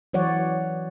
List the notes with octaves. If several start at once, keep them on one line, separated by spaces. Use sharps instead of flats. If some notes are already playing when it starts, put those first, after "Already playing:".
E3 F#3 C#5 D5 F#5